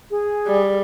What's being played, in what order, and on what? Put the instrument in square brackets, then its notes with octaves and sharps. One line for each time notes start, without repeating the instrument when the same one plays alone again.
[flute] G#4
[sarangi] G3